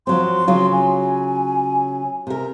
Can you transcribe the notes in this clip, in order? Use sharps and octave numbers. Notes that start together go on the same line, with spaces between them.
F3 F#3 C4 C6
C#3 F#3 F4
G#5
C3 A#4